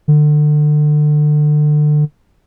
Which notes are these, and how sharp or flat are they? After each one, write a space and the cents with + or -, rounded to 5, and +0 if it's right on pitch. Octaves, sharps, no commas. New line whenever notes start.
D3 +30